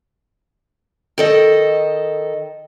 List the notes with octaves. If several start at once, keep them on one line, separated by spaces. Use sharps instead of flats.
D#3 A4 D#5